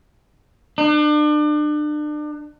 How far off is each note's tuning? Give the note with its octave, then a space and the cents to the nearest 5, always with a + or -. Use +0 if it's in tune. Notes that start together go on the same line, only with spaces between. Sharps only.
D4 +35